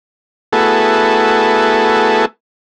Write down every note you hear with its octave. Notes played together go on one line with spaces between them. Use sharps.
A3 B3 E4 F#4 G#4 A4